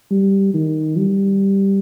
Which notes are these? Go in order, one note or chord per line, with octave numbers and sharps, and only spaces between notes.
G3
D#3
G3